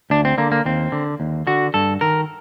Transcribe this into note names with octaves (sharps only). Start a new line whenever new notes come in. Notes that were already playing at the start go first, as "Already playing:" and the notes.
D2 D4
C4
D3 A#3
A#3
D#2 C4
D3
D#2
D3 F#4
G2 A4
D#3 A#4